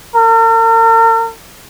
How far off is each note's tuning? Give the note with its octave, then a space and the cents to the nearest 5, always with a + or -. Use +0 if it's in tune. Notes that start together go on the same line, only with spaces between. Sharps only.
A#4 -45